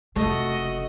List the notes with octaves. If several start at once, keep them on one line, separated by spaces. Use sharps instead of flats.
F1 C#3 A3 F#4 D#5